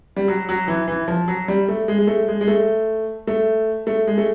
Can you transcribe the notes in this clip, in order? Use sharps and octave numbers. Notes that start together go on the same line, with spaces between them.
G3
F#3
F#3
E3
E3
F3
F#3
G3
A3
G#3
G#3
A3
G#3
G#3
A3
A3
A3
G#3
A3